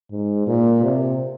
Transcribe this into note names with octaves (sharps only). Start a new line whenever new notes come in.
G#2
A#2
C3